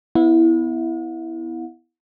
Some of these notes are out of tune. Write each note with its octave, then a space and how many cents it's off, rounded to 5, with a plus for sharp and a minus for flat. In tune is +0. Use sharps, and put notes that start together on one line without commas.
B3 +15 E4 -5 F#5 -45